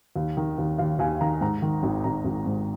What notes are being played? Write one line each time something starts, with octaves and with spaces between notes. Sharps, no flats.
D#2
D#3
D#2
D#2 F5
D#2 G#5
D#3 A#5
G#2 A#5
D#3
G#1
G#1 A#5
G#1
G#2